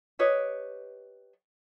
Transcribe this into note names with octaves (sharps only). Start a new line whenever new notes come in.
G4 B4 C#5 D#5